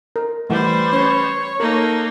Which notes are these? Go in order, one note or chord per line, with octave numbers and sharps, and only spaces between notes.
A#4
E3 G3 A3 B4 C5
C#4 C#5
A#3 D#4 A4 A#4